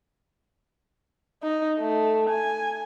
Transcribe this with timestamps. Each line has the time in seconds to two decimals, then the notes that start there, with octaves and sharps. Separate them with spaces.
1.43 D#4
1.78 A3
2.30 G#5